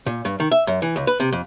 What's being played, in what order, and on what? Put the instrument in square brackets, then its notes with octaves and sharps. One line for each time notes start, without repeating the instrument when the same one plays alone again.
[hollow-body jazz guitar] A#2
G2
D#3
E5
F#2
E3
C#2
B4
C3
F2